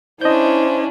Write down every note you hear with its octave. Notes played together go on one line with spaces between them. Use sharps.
C#4 D4 E4 C5 D#5 G6